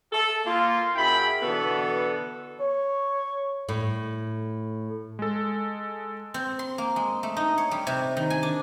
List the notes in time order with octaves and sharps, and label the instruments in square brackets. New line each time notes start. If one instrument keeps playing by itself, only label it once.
[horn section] A4
A#3 F4
F#2 E4 G#4 G5 B5
B2 D3 E3 B3 A4
[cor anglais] C#5
[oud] A2
[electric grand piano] G#3 A4
[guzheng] C4
C6
A#3
G#3
A3
D#4
C#5
G3
C3
D#3
G#5
D4